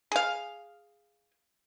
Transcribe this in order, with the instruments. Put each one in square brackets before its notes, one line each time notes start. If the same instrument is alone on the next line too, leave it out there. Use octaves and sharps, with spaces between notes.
[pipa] G#4 F5